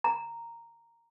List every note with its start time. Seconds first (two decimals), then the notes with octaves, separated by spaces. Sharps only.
0.04 A#5